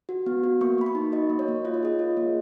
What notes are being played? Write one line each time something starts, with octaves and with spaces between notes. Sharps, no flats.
F#4
B3
F#4
A#3 C#6
A#3 B5
C#6
D#4
F#4 D#5
A#3
C#5
A#3
F4 D#5
C#5
G#4 D#5
F4
A#3